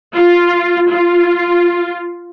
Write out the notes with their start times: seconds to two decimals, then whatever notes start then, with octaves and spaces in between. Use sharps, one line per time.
0.15 F4
0.89 F4